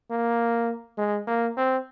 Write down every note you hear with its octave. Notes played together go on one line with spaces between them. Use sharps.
A#3
G#3
A#3
C4